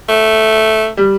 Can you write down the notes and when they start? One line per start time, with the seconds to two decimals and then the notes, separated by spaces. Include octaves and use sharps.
0.09 A3
0.97 G3